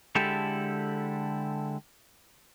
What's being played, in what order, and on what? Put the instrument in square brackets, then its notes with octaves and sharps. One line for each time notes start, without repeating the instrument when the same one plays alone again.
[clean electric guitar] D3 G#3 E4 G4 A4